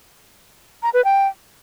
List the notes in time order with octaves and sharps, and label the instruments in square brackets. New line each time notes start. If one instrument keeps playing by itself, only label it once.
[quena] A#5
B4
G5